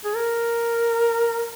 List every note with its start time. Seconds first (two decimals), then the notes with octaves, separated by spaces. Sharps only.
0.04 G#4
0.16 A#4